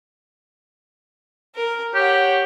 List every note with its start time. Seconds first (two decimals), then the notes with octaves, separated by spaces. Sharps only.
1.55 A#4
1.94 G4 C#5 F#5